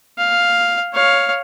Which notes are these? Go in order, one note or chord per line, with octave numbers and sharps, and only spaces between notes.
F5
C#5 F5